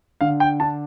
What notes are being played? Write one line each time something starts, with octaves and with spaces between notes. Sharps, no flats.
D3 F5
G5
D4 A5